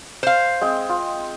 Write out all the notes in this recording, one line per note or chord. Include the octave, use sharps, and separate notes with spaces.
C5 F5
G#3 C4 G5
F4